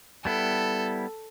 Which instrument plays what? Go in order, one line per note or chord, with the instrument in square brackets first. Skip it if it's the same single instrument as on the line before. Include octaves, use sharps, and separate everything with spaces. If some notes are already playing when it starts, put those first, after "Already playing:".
[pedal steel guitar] G3 B3 E4 [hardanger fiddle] A4